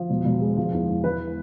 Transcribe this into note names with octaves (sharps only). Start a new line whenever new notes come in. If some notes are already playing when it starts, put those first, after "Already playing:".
Already playing: F3
E1
E1
G#3
F3
E2
E2
E3 B4